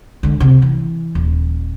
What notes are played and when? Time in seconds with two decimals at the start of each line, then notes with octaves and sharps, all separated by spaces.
0.23 D3 G#3
0.40 C3
0.62 E3
1.15 D#1